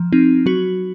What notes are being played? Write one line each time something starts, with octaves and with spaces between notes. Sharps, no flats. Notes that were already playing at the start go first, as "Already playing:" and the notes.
Already playing: F3
C4 D#4
F#3 F#4